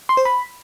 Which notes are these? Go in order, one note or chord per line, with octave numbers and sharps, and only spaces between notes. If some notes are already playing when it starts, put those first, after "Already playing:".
C6
C5
B5